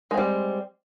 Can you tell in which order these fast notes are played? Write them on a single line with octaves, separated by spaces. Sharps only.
G#3 C4 G3